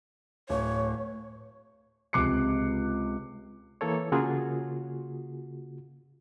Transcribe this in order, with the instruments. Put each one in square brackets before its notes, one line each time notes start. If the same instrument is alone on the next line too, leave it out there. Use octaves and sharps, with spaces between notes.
[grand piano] D1 [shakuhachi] C#5
[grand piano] C#2 C3 D6 F#6 C7 C#7
[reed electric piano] E3 A#3 A4 C#5
C#3 A#3 F4 F#4 G#4